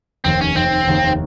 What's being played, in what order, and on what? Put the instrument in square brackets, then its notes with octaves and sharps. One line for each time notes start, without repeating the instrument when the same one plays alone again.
[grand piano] F1 D#2 D#3 [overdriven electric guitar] C4
[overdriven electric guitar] C#4
[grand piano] F1 D#2 D#3 [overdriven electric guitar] C4
[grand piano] F1 D#2 D#3